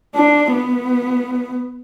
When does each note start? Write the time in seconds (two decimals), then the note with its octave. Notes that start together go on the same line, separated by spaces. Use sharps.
0.15 D4
0.52 B3